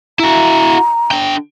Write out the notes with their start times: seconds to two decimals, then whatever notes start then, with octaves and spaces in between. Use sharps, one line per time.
0.20 E4 F#4 A#5
1.11 D3 G5